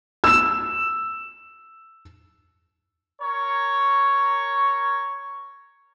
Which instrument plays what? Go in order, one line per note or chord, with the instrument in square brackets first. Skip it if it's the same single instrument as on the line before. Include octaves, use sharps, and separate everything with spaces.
[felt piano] E6 E7
[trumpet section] A#4 C#5